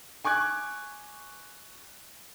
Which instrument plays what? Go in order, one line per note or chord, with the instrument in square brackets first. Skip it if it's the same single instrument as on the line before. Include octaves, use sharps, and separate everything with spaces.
[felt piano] G#5 C#6 D6 F#6 G#6